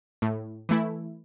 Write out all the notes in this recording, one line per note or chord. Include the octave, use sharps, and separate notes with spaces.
A2
E3 A3 E4